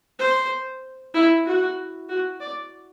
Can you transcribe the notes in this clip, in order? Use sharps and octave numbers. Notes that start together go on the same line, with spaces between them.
C5
E4
F#4
F#4
D5